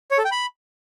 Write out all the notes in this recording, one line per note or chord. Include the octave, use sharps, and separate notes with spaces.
C#5
A4
G5
B5